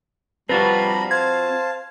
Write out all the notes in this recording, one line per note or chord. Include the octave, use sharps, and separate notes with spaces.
G3 C4 D4 F4 F#4 B4 A#5 B5
C5 F5 A5 G#6